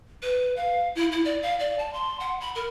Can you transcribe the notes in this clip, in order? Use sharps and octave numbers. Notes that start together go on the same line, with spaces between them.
B4
F5
E4
E4
D5
F5
D5
A5
C6
F#5
B5
A#4